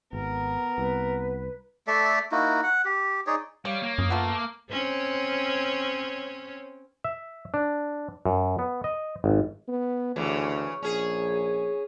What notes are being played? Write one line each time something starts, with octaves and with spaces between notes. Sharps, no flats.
G#1 B3 A#4
C2 B4
A3 A4 D5 E5
A#3 D#4 E4 F#4
F#5
G4
D#4 G#4 C#5 D5
G3 C#5 F5
A#3
F#2 D#6
A3 B3 F4
D6
C4 C#4 C#5
E5
D4
F#2
B3
D#5
G#1
B3
D2 C#3 E3
A#1 C#4 G#4